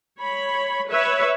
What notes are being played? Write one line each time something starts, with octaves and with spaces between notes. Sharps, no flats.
C#5 B5
B4 C#5 E5